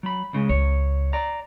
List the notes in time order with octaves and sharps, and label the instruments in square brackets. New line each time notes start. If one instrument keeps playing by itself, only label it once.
[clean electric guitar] F#3 B5
C#2 C#3 G#3
[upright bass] C#2 [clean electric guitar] C#5
[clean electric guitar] D5 A#5